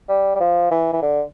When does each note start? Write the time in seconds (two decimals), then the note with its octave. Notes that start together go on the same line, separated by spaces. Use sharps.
0.09 G3
0.35 G3
0.40 F3
0.71 E3
0.93 E3
1.02 D3